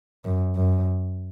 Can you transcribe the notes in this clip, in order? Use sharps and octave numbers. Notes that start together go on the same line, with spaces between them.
F#2
F#2